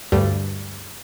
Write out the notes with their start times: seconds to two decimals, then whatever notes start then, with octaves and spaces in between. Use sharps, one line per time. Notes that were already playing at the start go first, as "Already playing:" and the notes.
0.12 D2 G2 G3 A3